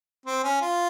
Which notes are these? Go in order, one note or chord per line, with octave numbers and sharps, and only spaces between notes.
C4
C#4
F4